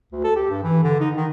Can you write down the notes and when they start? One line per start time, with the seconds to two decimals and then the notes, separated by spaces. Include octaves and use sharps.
0.12 D2
0.24 A4
0.36 G4
0.50 G2
0.63 E3
0.83 D3
1.00 D#4
1.17 D#3